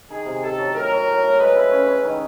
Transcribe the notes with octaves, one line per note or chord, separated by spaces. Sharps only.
D#3 G#4
C3
C3 A4
F#3
A2 A#4
F#3
A2
A2
G#3 B4
E4
C#4
C#4
D#3